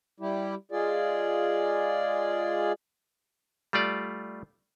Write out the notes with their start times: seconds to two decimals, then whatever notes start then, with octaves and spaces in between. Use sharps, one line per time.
0.20 G3 E4 G4
0.72 G#3 F4 G#4 D5
3.73 G3 A3 F4 D5